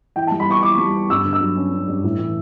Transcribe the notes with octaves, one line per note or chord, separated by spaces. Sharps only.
E3 G5
A5
G3
B5
B3 C#6
E3 D6
G3
B3
G2 E6
D3
E6
F#3
C#4
C#4
G2
A2
E3